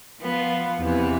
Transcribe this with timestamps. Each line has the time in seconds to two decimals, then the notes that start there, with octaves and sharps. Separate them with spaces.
0.21 F3 B3 F4
0.81 E2 C3 E3 B3